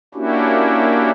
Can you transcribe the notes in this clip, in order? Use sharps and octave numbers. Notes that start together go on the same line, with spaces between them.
A#3 C#4 D4 E4 F#4 G4